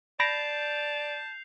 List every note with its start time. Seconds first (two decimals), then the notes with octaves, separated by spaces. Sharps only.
0.20 D5 A5 B5 G6 A#6 C7 D7 F7